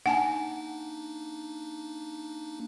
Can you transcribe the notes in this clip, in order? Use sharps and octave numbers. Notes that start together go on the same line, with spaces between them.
A#3 D4 D#4 F#5 G#5 A5